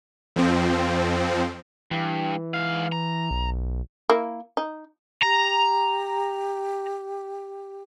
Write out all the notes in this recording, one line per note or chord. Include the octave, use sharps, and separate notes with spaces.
F2 F3 C4
G2 E3
G#2 F5
A#5
B1
A#3 E4
D#4
G4 A#5